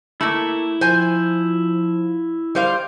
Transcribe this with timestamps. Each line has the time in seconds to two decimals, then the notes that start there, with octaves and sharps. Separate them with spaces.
0.21 A3 A#3 E4
0.81 F3 C5 G#5
2.55 G3 C5 F5